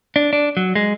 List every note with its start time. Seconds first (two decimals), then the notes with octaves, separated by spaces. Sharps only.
0.16 D4
0.33 D4
0.57 F#3
0.75 G#3